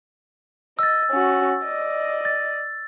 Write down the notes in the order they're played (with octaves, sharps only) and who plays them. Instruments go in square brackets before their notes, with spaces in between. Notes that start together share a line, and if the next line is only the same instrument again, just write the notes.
[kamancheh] D#5 [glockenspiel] E6 A6
[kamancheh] C#4 F#4
D5 D#5
[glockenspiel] A6